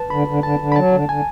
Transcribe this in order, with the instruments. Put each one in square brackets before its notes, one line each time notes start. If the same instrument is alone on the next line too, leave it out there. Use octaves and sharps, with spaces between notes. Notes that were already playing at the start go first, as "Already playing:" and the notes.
Already playing: [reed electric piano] B4 A5
[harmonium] D3 [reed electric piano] B5
[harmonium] D3
[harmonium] D3 [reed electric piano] A5
[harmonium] D3
[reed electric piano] B5
[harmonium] F#3 [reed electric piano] A5
[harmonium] D3
[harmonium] D3 [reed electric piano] G#5